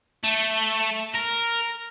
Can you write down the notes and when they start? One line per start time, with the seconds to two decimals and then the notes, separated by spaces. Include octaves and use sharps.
0.24 A3
1.15 A#4